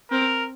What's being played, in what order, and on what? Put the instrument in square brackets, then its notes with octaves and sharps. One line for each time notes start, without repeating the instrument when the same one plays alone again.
[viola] C4 [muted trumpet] A#4